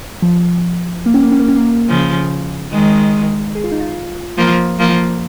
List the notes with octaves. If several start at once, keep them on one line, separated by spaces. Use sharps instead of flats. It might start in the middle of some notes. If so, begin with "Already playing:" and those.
F3
A#3
C#4
A#3
C#4
A#3
C#4
A#3
C#3 F3
D#3 G#3
G#4
F4
D#4
F4
F3 A#3
F3 A#3